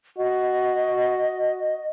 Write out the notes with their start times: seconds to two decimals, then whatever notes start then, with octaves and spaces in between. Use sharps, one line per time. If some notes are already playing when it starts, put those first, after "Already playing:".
0.18 F#4 D#5